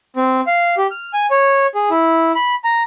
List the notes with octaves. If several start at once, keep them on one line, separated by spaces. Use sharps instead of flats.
C4
F5
G4
F6
G#5
C#5
G#4
E4
B5
A#5